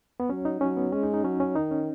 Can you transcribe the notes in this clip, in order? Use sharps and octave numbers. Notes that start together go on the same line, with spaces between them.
B3
F#3 C#4
D#4
F#3 C#4
B3
G#3 C#4
D#4
D#4
F#3 C#4
C#4
D#3 D#4
C#4